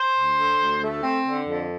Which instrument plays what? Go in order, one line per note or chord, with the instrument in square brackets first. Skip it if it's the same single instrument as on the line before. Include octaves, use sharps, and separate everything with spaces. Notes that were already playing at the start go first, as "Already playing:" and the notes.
Already playing: [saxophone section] C5
D2
D3
D2
A3
C4
D3
F2